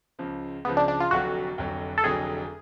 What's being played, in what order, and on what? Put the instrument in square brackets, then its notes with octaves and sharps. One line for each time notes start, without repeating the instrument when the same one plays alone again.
[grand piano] C#2 C#3 F3
[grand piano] C#2 C#3 F3 [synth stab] B3
[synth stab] D4
D4
F4
[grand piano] F1 F2 D3 F#3 [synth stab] F#4
[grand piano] F1 F2 D3 F#3
[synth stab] A4
[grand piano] F1 F2 D3 F#3 [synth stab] G#4